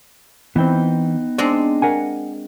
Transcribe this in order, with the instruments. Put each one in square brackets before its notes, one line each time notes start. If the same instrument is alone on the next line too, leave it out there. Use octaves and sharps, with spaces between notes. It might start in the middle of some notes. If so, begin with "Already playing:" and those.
[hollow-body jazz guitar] E3 C4 [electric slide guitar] B3 D#4 G5
[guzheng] G#3 C4 D4 [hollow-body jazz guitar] D5
[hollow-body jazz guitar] A#4 F#5 G#5